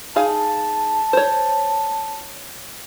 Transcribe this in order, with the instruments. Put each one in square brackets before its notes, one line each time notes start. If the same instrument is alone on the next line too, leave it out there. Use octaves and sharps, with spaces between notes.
[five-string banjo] D#4 G#4 F5 [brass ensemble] A5
[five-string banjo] C5 C#5